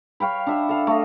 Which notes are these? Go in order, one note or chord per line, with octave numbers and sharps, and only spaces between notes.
C#5 F5 G5 B5
D4 E5 F#5
A4 F5
A3 D#5